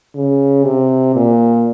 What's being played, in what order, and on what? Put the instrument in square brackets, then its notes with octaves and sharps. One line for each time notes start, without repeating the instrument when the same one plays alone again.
[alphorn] C#3
C3
A#2